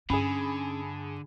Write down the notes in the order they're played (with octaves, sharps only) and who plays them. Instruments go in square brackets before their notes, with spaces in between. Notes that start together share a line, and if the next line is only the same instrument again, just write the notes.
[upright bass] G2 [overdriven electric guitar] D3 [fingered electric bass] C#4 [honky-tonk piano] G#4 G#5 B5